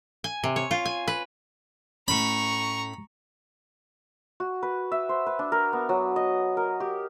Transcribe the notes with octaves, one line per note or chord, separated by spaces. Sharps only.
G#5
C3
C#5
F4
G#5
B4
A2 C#4 A#5 B5 C#6
F#4
B4
E5
C5
B4
D4
A#4
B3
F#3
D#5
A#4
G4